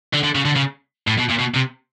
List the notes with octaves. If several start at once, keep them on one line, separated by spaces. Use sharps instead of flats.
D3
D3
C#3
D3
C#3
A2
B2
A#2
B2
C3